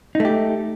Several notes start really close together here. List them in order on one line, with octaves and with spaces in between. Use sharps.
D#4 A3 G4